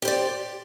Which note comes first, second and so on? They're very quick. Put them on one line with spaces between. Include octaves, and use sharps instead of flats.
G4 C5 D5